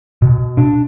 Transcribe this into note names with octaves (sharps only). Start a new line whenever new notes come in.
B2
D4